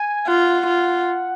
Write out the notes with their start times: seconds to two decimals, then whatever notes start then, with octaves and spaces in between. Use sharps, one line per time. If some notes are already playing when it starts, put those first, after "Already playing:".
Already playing: G#5
0.28 F4 F#5
0.67 F4